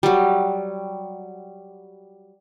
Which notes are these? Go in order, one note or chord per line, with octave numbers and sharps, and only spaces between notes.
F#3 G3